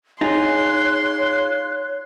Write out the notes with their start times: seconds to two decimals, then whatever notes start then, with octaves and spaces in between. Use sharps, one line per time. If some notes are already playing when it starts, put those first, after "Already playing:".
0.21 D#4 F4 G#4 C#5 C6 F#6